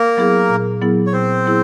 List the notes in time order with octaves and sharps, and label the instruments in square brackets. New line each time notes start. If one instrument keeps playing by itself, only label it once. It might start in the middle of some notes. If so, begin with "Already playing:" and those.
Already playing: [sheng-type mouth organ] A#3 A#4
[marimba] F#3 B3 E4 G#4
A#2
F#3 B3 E4 G#4
[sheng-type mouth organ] C#5
[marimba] A#2 [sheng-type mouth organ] C4 C5
[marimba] F#3 B3 E4 G#4